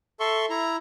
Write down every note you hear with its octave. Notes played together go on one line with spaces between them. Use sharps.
A4 E5 C6 C#6
E4 A#5